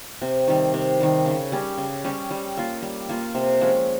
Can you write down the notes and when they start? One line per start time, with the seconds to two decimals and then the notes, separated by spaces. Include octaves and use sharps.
0.22 C3
0.48 D#3 G3
0.74 C3
1.00 D#3 G3
1.26 C#3
1.52 G3 C#4 G4
1.78 C#3
2.04 G3 C#4 G4
2.31 G3
2.57 A#3 F4
2.82 G3
3.09 A#3 F4
3.35 C3
3.61 F3 G#3 C#4